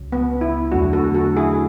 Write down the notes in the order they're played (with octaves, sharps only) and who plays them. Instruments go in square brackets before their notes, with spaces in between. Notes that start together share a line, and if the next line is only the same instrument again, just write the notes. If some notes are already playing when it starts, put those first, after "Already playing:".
Already playing: [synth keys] C#2 C#3 F#3
[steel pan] B3
E4
[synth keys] E2 D3 F#3 A3 D4 [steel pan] F#4
[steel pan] F#4 A4
F#4 A4
E4 G#4